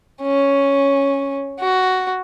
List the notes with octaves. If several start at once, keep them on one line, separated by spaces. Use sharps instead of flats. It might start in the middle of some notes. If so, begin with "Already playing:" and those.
C#4
F#4